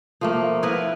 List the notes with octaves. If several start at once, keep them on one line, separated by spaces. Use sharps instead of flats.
F3 A3 A#3
B3 E4 A#4 B4